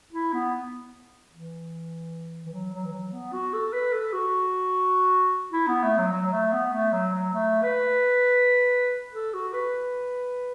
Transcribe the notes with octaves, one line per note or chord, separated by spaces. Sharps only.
E4
B3
E3
E3
F#3
F#3
E3
F#3
B3
F#4
A4
B4
A4
F#4
E4
B3
A3
F#3
F#3
F#3
A3
B3
A3
F#3
F#3
A3
B4
A4
F#4
B4